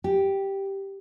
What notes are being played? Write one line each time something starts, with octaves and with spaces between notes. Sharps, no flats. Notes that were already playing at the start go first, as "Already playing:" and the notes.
G4